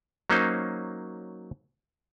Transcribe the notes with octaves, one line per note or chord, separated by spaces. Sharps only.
F#3 A#3 C#4 D#4 C5